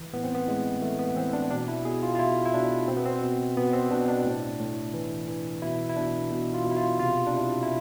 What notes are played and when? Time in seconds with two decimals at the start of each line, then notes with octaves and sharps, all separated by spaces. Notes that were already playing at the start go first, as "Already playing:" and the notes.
Already playing: E3
0.13 A2 B3
0.24 C4
0.34 B3
0.47 A2 G#3
0.82 E3 A3
0.99 B3
1.16 E3 C4
1.33 D4
1.50 B2 D4
1.68 E4
1.85 B2 G#4
2.03 F4
2.15 F4
2.19 B2 E4
2.46 E4
2.54 B2 D4
2.88 B2 C4
2.96 B3
3.06 C4
3.22 B2
3.57 B2 B3
3.73 C4
3.91 B2 D4
4.08 D4
4.25 A2
4.60 A2
4.94 E3
5.28 E3
5.62 B2 E4
5.89 E4
5.96 B2 D4
6.31 B2
6.54 F4
6.65 B2
6.71 E4
6.77 F4
7.00 C3 F4
7.27 D4
7.34 C3 E4
7.63 E4